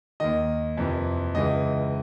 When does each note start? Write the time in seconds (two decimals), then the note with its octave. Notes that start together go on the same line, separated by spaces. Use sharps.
0.20 D#2 D#3 D#5
0.77 F2 C3 E3
1.35 C#2 C#3 E3 D#5